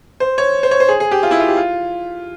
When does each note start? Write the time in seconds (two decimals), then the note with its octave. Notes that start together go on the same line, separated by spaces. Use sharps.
0.20 C5
0.38 C#5
0.63 C5
0.71 C#5
0.80 C5
0.89 G#4
1.00 G#4
1.11 G4
1.23 F4
1.31 E4
1.40 F4
1.48 G4
1.57 F4